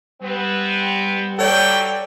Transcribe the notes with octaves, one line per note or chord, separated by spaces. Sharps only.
G3 B3 C4
G2 E3 F#3 A4 C#5 D5 G5